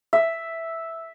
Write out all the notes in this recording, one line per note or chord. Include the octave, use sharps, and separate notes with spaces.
E5